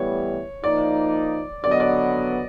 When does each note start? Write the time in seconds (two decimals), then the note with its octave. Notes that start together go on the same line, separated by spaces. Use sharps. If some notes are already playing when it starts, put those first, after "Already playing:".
Already playing: A2 E3 G3 B3 C#5
0.63 F3 A#3 D#4 D5
1.63 D3 F#3 B3 D5
1.71 D#5
1.80 D5